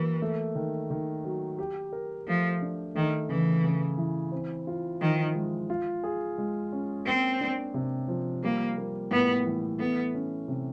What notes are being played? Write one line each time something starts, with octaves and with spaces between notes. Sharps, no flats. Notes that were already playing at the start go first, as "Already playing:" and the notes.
Already playing: E3 F#3 A#3
A3
D#3
D#3
F#3
G4
A#4
F3 A3
D4
D#3 A3
C#3 E3
C#3
E3
C4
F4
D#3 F3
G#3
F4
G#4
G#3
C#4
A#3 C4
D4
C3
F3
G3 A#3
A#3
A2 B3
E3
A3 B3
C#4
C3